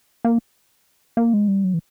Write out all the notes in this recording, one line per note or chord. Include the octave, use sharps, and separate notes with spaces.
A#3
A#3
G#3
G3
F#3
E3